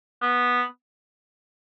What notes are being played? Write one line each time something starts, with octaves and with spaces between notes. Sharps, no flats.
B3